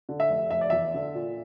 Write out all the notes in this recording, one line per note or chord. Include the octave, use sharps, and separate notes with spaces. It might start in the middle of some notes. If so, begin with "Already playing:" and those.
D3
E5
F1
F1 E5
D5
E2 E5
D3
A#2